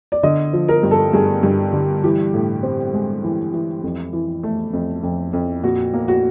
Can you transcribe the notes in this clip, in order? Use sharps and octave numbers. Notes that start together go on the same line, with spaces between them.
D5
D3 D#5
F3
A#4
G2
A4
G2 G#4
G2
D3
E3 G4
A2
C4
G#3
E3
E3
F2
E3
A3
F2
F2
F2
A#2 F#4
A#3
F#4